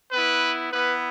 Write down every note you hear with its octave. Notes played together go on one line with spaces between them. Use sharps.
B3 E4 B4
B3 E4 B4